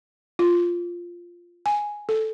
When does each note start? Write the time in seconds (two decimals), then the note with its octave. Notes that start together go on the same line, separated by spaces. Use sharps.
0.39 F4
1.66 G#5
2.09 A4